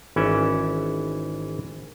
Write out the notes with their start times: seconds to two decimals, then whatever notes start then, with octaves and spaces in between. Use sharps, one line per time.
0.16 G#1 E3 C#4 D5 E5